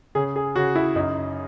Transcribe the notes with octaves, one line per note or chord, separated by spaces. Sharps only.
C#3 G#4
G#4
C#3 F#4
E4
F#2 D#4